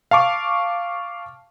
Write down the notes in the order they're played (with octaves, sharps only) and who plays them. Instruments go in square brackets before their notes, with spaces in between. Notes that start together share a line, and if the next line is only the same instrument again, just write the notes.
[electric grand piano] F5 A5 C#6 D6